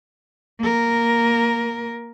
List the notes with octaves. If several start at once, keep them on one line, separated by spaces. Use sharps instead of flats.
A#3 A#4